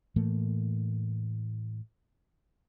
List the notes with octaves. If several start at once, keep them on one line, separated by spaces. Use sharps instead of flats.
A2 E3 A3 A#3